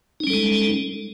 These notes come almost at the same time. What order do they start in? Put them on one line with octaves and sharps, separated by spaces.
D#4 C#4 G3 A4 G#3